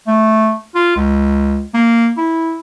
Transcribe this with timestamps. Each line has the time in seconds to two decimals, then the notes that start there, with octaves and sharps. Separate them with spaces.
0.07 A3
0.75 F4
0.96 C#2
1.74 A#3
2.17 E4